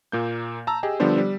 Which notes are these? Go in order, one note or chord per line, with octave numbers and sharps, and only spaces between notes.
A#2 A#3 G6
A5 A#5 E6
G4 G#4 D#5
D3 F3 G3 B3 D4 C5
G3